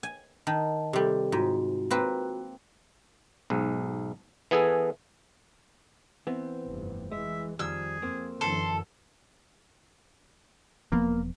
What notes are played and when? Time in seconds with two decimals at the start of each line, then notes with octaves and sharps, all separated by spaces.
0.03 G#5
0.47 D#3 A5
0.93 C3 G3 G4 A4
1.32 G#2 F4 F#4
1.91 A#3 C4 B4
3.50 B1 G#2
4.51 E3 B3 G#4 A4 G#5
6.27 E3 B3 C4
6.68 F1 G2
7.12 E3 G#3 E5
7.59 F2 D#3 F3 G3 G#4 E6
8.02 F2 A#3 C4
8.41 F#2 D3 E3 A4 C6
10.92 E1 F3 A#3 B3